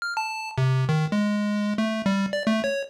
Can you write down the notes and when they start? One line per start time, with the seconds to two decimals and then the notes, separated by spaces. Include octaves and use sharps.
0.02 F6
0.17 A5
0.58 C3
0.89 D#3
1.12 G#3
1.78 A3
2.06 G3
2.33 D5
2.47 A3
2.64 C#5